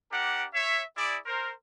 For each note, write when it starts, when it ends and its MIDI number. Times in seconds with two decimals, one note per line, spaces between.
0.12 0.46 62
0.12 0.46 67
0.12 0.46 70
0.12 0.46 78
0.54 0.83 73
0.54 0.83 76
0.96 1.17 64
0.96 1.17 68
0.96 1.17 74
1.26 1.50 70
1.26 1.50 72